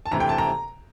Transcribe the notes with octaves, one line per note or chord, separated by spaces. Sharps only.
A5
D2 C3 E3 A#5
G5
A5
A#5